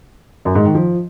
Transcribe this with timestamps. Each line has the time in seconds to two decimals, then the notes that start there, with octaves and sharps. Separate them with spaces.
0.45 F#2
0.55 G#2
0.65 D#3
0.75 F3